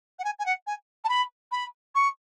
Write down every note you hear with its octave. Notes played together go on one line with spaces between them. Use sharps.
F#5
G#5
G#5
F#5
G#5
A5
B5
B5
C#6